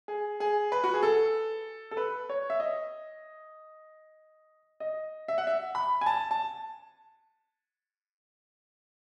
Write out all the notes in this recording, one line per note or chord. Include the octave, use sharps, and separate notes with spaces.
G#4
G#4
B4
F#4
G#4
A4
A4
B4
C#5
E5
D#5
D#5
E5
F#5
E5
B5
G#5
A5
A5